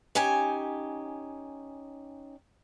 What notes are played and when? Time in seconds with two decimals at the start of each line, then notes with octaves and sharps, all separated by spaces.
0.15 C#4 D#4 G4 G#5